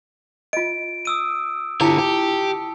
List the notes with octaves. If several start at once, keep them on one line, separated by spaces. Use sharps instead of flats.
F4 D#5 D7
D#6 E6 D#7
D3 E4 F4 G4 A5 C#7
G4